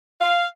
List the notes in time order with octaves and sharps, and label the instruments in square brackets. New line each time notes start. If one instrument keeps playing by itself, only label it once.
[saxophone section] F5